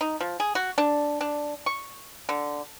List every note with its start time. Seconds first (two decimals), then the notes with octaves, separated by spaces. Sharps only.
0.01 D#4
0.20 F3
0.40 G#4
0.55 F#4
0.78 D4
1.21 D4
1.66 C#6
2.29 D3